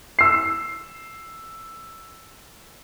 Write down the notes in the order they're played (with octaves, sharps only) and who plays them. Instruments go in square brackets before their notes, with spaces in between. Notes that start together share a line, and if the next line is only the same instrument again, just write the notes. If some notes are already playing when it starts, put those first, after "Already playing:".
[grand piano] E6 C7